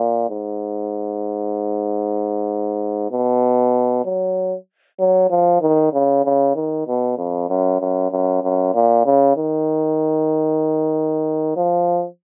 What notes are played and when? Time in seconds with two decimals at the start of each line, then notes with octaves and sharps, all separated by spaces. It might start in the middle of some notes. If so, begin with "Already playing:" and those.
Already playing: A#2
0.30 G#2
3.11 B2
4.05 F#3
5.00 F#3
5.30 F3
5.61 D#3
5.93 C#3
6.25 C#3
6.55 D#3
6.87 B2
7.18 F2
7.50 F#2
7.81 F#2
8.11 F#2
8.43 F#2
8.74 A#2
9.06 C#3
9.37 D#3
11.57 F3